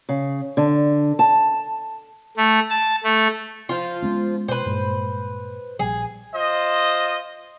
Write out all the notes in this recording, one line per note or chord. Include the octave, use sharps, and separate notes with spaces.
C#3
D3
A5
A3
A5
A3
F3 F4
G#3 B3 C#4
B2 B4 C5
G2 A#2 G#3
A#1 G3 G#4
F4 C5 D#5